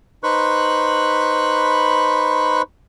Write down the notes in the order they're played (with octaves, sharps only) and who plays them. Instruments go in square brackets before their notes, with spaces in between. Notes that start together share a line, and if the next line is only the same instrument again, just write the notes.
[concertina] D#4 B4 C5 B5 C#6 F#6